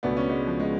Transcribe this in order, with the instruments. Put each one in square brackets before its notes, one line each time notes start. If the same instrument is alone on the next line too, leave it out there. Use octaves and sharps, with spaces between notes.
[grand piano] C#2 B2 A3 D4 F#4 [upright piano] B3
[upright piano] C#4
G#3 B3
F3
G#3